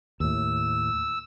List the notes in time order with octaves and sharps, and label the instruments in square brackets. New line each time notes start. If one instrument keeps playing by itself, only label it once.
[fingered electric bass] D#2 A2 [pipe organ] E6